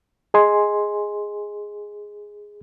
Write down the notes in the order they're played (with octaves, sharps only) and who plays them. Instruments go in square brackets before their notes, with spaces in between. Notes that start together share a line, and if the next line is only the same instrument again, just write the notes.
[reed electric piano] G#4 D#5 G#5 C6